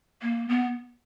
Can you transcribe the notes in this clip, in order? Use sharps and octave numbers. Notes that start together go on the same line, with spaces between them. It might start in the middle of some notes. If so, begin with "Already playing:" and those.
A#3
B3